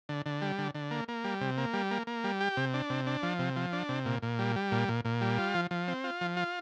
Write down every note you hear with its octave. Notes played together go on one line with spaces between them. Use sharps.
D3
D3
G3
D3
D3
A#3
A#3
G3
C3
A#3
G3
A#3
A#3
G3
G4
C3
D4
C3
D4
F3
C3
F3
D4
C3
A#2
A#2
G3
G3
A#2
A#2
A#2
G3
F4
F3
F3
C4
F4
F3
F4